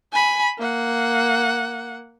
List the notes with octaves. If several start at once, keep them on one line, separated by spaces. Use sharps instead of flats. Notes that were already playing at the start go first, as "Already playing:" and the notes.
G#5 B5
A#3 F#5